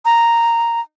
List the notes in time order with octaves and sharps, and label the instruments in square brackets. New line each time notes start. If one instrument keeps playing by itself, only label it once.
[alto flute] A#5